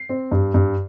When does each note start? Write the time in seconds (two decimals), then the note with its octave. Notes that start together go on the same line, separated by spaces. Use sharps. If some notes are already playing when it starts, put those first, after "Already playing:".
Already playing: C7
0.09 C4
0.32 G2
0.54 G2